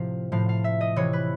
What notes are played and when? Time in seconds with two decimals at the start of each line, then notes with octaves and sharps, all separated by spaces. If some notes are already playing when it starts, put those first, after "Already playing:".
Already playing: A2 C3 F3 F5
0.32 A2 F3 F5
0.49 F5
0.64 E5
0.81 D#5
0.96 C3 E3 C#5
1.13 B4